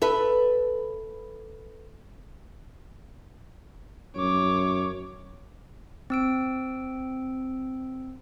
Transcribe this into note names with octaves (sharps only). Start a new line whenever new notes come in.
A4 B4 E5
F#2 C#5 D6
C4 E6 D7